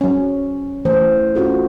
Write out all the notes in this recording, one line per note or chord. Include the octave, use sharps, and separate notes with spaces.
F#3 C#4
E3 A3 C5
C#4 F4 F#4 A4